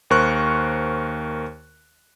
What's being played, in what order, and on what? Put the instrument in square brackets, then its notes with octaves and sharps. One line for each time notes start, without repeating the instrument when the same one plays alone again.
[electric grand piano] D#2 A#4 C5 C#6 F#6